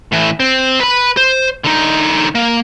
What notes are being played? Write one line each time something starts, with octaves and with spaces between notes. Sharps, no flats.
A2 E3
C4
B4 B5
C5
D3 D#4
A#3